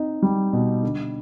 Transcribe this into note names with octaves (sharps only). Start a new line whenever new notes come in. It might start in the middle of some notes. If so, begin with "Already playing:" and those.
Already playing: C4 D#4
G3
B2
D3